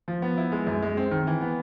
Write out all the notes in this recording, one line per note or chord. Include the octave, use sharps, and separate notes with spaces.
F3
B3
E4
G#3
F#2
G#3
C4
D#3
E3
B3